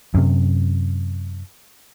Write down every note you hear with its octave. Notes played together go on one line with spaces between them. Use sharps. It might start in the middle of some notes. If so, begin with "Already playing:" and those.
F#2 C3